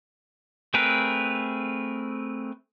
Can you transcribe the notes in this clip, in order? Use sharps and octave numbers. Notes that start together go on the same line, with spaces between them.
A3 C4 G#4 A#4 B4